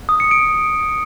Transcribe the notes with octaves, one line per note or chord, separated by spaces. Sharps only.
D#6
C#7
D7